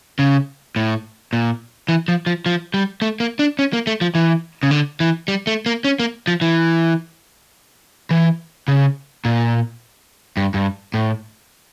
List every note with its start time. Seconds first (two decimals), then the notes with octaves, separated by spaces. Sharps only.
0.19 C#3
0.76 A2
1.33 A#2
1.89 E3
2.08 F3
2.26 F3
2.46 F3
2.74 G3
3.02 A3
3.20 A#3
3.39 D4
3.59 C#4
3.73 A#3
3.87 A3
4.01 F3
4.15 E3
4.63 C#3
4.71 D3
5.00 E3
5.28 G3
5.47 A3
5.66 A#3
5.84 C#4
5.99 A#3
6.27 F3
6.41 E3
8.11 E3
8.68 C#3
9.25 A#2
10.37 G2
10.54 G2
10.94 A2